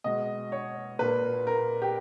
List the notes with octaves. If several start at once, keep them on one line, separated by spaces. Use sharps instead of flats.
B2 G#3 D#5
C#5
A#2 A#3 B4
A#4
G4